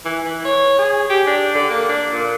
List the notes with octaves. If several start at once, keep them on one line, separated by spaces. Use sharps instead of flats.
E3
E3
C#5
G#4
G4
D4
D3
A#3
D4
A#2